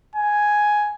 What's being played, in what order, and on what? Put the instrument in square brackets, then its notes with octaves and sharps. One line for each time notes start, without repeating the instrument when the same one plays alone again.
[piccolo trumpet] G#5